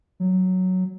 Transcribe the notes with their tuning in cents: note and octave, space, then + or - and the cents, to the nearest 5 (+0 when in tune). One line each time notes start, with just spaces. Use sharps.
F#3 +0